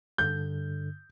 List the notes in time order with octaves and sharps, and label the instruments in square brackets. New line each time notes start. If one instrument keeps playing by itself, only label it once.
[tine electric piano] G2 D3 [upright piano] G6